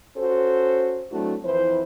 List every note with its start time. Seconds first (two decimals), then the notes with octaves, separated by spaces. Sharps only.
0.17 C#4 F#4 A4 C5
1.11 F#3 A3 C4 D4 E4 F#4
1.44 F2 E3 E4 B4 C5